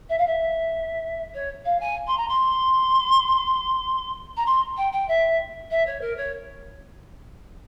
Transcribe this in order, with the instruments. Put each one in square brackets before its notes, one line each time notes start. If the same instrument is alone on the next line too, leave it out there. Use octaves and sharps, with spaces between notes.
[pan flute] E5
F5
E5
C#5
F5
G#5
C6
A#5
C6
A#5
C6
G5
G5
E5
E5
C#5
A#4
C#5